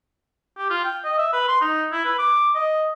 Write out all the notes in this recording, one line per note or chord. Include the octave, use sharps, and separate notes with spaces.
G4
F4
G5
D#5
E5
B4
C6
D#4
E4
B4
D6
D#5